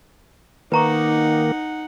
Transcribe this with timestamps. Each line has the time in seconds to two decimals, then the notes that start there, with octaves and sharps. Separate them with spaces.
0.72 D#3 A#3 D#4 B4 F#5 A#5 C#6